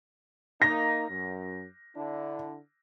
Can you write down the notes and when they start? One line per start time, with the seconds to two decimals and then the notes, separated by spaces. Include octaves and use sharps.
0.62 A#3 D#4 A#6
1.09 F#2
1.96 D3 D4 E4